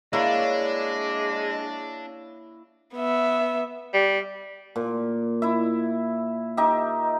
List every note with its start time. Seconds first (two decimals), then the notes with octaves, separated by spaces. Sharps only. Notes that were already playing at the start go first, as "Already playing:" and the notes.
0.13 G#3 A#3 D4 E4 C#5 F5
2.96 B3 E5
3.94 G3
4.76 A#2
5.42 E4 E5
6.57 D#4 G4 E5